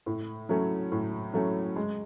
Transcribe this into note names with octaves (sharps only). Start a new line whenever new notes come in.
A2
F#3 A3 C#4
A2
F#3 A3 C#4
G#3